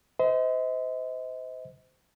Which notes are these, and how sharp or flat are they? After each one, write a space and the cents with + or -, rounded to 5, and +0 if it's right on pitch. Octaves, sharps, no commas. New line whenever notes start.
C5 -30 D#5 +35